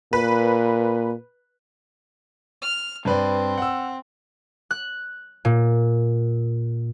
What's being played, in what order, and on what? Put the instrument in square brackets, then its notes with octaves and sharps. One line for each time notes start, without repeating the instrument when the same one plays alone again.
[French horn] A#2 [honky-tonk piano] B4
[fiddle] F6
[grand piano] G2 B4 D5 [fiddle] C4
[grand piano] F#5 E6
[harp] F#6
A#2